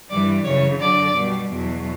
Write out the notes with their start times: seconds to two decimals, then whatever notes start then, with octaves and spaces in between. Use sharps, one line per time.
0.09 G2 E3 G3 D5
0.44 F#2 C#3 E3 C#5
0.79 F#2 D3 F#3 D5
1.16 B2 G3
1.50 E2 B2 F#3